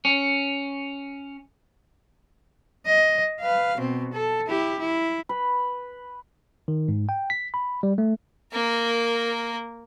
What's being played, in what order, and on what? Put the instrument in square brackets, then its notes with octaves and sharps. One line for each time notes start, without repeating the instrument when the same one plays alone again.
[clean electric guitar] C#4
[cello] D#5
B4 F5
B2 C4
A4
E4 G4
E4
[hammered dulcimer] B4
[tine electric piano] D#3
G#2
G5
B6
B5
G3
A3
[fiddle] A#3 A#4